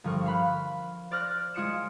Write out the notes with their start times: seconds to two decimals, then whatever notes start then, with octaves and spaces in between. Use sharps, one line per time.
0.04 G1 F3 A#4 C#6
0.26 F5 B5 F#6
1.11 C5 D5 D6 F6 F#6 A#6
1.54 G#3 F4 D#6 C#7 D7 E7